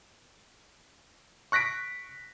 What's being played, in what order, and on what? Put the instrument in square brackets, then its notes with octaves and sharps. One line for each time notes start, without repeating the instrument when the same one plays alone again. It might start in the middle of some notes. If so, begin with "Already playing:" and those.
[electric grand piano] C#6 F#6 A#6 B6 D7